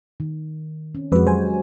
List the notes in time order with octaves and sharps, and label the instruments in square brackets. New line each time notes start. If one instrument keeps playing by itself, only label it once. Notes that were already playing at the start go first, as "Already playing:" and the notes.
[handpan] D#3
C4 C#4
[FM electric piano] F2 B4 [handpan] G#3 F#4
[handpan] F#3 G4 [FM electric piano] C5 G#5